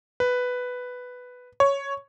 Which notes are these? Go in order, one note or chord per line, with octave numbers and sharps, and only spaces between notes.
B4
C#5